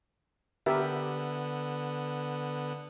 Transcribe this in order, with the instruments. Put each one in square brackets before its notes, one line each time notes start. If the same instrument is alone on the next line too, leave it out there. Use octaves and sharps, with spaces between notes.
[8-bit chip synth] D3 B3 [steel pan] G4 A#4 E5